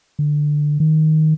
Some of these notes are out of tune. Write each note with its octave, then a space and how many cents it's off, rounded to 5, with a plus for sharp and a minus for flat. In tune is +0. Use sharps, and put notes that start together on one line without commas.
D3 +10
D#3 +5